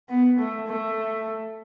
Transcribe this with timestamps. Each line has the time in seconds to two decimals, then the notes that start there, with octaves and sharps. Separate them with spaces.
0.09 B3
0.39 A3
0.67 A3